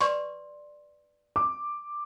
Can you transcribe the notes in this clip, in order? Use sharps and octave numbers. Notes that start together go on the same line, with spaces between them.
B4 D5 C6 C#6
D6